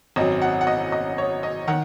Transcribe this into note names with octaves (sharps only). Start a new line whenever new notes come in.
G#1 F#2 F#3 D#5
F#5
F#5
D#5
D#5
C#5
D#5
D#3 F#5